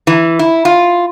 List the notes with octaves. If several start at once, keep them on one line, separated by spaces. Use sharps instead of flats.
E3
E4
F4